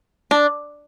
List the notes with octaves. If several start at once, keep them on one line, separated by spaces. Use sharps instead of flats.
D4